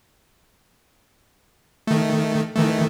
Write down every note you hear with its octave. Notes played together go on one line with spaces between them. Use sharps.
D#3 A3
D#3 E3 A3